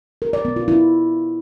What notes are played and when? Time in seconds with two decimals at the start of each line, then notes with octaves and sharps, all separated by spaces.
0.22 A#4
0.33 D5
0.45 B3
0.56 F4
0.68 E4